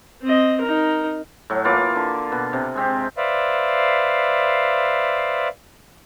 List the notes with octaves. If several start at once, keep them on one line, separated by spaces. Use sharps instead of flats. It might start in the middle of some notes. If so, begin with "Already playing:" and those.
C4 D#5
D#4 A#4
A2 F#3
E3 A#3 F4 D6
D3
B2
C3
G#3 C4 G4
B4 C5 D5 E5 F5